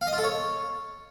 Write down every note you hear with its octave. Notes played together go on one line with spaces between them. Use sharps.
F5
D#5
F4
A4
C#5